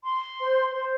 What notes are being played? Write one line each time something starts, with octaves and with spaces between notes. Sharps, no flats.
C6
C5
C5